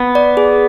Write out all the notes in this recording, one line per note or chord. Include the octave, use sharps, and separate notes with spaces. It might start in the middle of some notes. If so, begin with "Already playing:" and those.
Already playing: B3
D5
G#4